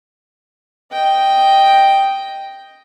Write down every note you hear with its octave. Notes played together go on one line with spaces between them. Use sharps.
D#5 G5